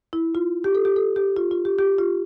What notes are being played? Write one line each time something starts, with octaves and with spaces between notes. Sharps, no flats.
E4
F4
G4
A4
G4
A4
G4
F4
F4
G4
G4
F4